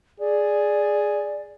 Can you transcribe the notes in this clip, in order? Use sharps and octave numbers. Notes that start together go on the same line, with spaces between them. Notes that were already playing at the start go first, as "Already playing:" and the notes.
G#4 D5